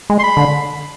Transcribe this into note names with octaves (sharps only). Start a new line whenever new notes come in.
G#3
C6
B5
D3